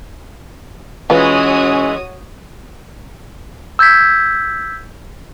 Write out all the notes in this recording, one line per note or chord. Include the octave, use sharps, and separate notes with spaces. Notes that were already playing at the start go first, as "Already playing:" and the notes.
E3 G#3 C#4 F4 F#4 B4 C#5 D#6
E6 G6 G#6 B6